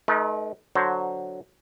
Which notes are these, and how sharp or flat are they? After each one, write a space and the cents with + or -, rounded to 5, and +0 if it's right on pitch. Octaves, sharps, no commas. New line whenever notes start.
A3 -40 D#4 +0 B4 -45
D3 +0 F#3 +0 C5 +10